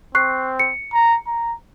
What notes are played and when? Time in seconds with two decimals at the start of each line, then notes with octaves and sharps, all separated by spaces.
0.15 C4 C#6 F#6 C7
0.60 C#7
0.93 A#5
1.27 A#5